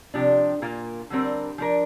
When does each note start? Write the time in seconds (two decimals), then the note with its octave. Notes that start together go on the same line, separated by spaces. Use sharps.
0.14 C3 F3 D4 G4
0.62 A#2 A#3 F4 A#4
1.10 D3 G3 C4 A#4
1.58 F3 D4 A#4